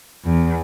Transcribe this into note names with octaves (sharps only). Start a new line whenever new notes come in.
E2